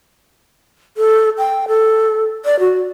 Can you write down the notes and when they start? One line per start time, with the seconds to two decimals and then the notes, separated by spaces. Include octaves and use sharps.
0.97 A4
1.38 G5
1.68 A4
2.45 D5
2.59 F#4